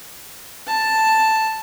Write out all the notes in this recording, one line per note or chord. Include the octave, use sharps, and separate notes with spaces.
A5